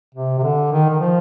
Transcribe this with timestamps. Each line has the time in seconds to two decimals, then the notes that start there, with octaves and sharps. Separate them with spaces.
0.15 C3
0.39 C3
0.43 D3
0.72 D#3
0.90 D#3
1.00 F3